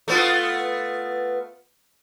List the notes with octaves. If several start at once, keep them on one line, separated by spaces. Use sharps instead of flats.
A3 B3 F4